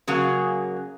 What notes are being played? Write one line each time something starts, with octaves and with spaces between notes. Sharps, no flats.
C#3 F#3 A#3 G#4